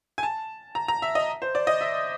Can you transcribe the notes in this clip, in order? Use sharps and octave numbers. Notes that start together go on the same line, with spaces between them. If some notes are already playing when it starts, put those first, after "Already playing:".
G#5
A5
A#5
A#5
E5
D#5
C5
D5
D#5
E5